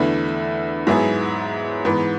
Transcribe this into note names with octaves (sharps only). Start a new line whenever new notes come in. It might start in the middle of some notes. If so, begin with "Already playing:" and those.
Already playing: E2 D3 A3 E4 B4
G#2 F#3 B3 E4 G#4
G#2 E3 B3